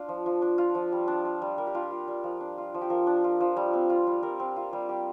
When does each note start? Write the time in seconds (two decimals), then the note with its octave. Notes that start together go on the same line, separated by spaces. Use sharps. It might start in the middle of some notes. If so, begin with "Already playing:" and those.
Already playing: D4 F4
0.09 F3
0.26 F3
0.42 D4
0.58 F4
0.75 F3
0.92 G3
1.08 D4
1.25 F4
1.42 G3
1.58 G3 A#4
1.67 G4
1.75 D4 F4
1.83 G4
1.91 F4
2.08 G3
2.24 F3
2.41 D4
2.58 F4
2.74 F3
2.81 G4
2.90 F3 A#4
3.07 D4
3.24 F4
3.41 F3
3.57 G3
3.73 C4
3.90 F4
4.07 G3
4.23 G3 A#4
4.40 C4
4.56 F4
4.73 G3
4.89 G3 G4